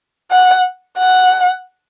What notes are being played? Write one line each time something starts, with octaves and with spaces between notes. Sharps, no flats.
F#5
F#5